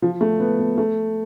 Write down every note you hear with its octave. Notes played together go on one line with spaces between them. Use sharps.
F3
A3
B3
B3
A3